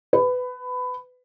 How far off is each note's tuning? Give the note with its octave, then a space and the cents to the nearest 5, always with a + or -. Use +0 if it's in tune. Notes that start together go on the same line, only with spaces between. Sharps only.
B4 +20